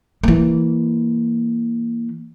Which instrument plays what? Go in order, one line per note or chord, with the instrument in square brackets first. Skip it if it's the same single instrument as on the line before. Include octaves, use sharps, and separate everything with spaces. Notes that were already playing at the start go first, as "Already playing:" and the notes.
[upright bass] E3 A#3